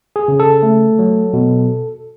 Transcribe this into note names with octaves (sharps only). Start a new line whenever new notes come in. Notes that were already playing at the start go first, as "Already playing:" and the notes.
G#4
C#3
A4
A3
F#3
B2